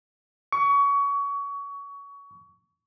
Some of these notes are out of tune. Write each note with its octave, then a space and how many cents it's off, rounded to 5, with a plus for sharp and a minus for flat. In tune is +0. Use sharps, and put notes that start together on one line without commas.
C#6 +25